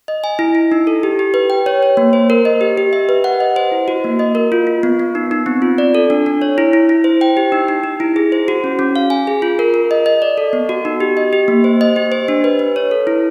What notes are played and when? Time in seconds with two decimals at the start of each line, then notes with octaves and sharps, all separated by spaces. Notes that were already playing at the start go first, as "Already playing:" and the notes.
0.08 D#5
0.24 G#5
0.39 E4
0.55 E4
0.72 D#4
0.87 A4
1.03 G4
1.19 G4
1.34 B4
1.50 G5
1.66 C#5
1.83 C#5
1.97 A#3
2.13 C5
2.30 A#4
2.45 D#5
2.61 G4
2.77 G4
2.93 E5
3.09 B4
3.24 F#5
3.40 D#5
3.56 C5
3.72 E4
3.88 F#4
4.04 A#3
4.19 D#5
4.35 A#4
4.52 F4
4.67 F4
4.83 B3
4.99 B3
5.15 D#4
5.31 D#4
5.46 C4
5.62 F4
5.78 D5
5.95 A4
6.10 D4
6.26 D4
6.42 C#5
6.58 E4
6.73 E4
6.89 E4
7.04 C5
7.21 G5
7.37 G4
7.52 D#4
7.68 D#4
7.84 D#4
8.00 E4
8.16 G#4
8.32 C5
8.48 F#4
8.64 C#4
8.79 C#4
8.96 F5
9.10 G#5
9.27 G#4
9.42 F4
9.59 A#4
9.74 A#4
9.91 D#5
10.06 D#5
10.22 D5
10.38 A4
10.53 B3
10.69 F#4
10.85 D#4
11.00 G4
11.17 D#5
11.33 G4
11.48 A#3
11.64 C5
11.81 D#5
11.96 G4
12.12 C5
12.28 D4
12.44 B4
12.59 B4
12.76 C#5
12.91 A4
13.07 E4